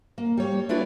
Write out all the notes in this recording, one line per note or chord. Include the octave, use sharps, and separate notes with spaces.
A#3
G3 C#5
D4 E4 F4 B4 D5